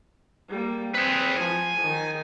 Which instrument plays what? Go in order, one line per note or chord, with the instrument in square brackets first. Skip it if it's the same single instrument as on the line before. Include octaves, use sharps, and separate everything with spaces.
[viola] G3 A#3
[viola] C4 [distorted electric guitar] G#4 B4
[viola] F3 [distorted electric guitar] G#5
[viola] D#3